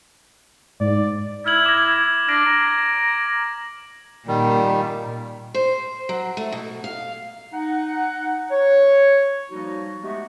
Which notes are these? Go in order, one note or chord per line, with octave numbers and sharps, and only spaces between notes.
G#2 D5
E4 F6 G#6 F#7
D6 A#6
D4 F6 A#6 D7
A#5
A#2 D#3 G3
C5
F#3
A3
B2
F5
D#4 F#5
C#5
F3 G3 A#3 D#4 F#4
G#3 A3 B3 F#4 G4